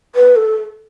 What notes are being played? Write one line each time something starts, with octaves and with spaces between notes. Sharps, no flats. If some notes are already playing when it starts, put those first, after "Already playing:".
B4
A4